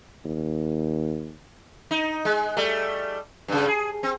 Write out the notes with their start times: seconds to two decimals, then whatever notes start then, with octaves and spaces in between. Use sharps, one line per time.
0.25 D#2
1.91 D#4
2.25 G#3
2.57 G3 A3
3.48 G2 C#3
3.68 G#4
4.03 C4